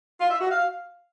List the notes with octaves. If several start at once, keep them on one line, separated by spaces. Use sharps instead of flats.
F4
E5
F#4
F5